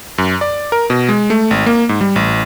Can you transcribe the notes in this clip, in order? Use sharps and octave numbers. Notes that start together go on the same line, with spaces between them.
F#2
D5
A#4
B2
G#3
A3
G#1
A#3
G#2
G3
A1